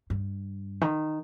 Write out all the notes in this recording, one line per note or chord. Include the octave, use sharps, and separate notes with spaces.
G2
D#3